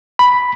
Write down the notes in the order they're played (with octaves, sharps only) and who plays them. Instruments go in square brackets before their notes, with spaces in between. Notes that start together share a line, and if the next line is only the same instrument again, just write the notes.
[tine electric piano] B5